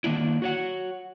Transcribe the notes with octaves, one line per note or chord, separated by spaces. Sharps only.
D#3 A#3 D4 E4
F#4 C#5 F#5